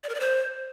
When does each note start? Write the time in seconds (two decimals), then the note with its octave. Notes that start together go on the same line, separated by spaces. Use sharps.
0.04 D5
0.09 A#4
0.15 D5
0.20 C5